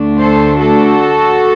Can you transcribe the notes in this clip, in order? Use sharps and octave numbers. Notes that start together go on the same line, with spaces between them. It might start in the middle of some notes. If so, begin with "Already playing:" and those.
Already playing: D2 D3 A3 D4
A4 C5
F#4 A4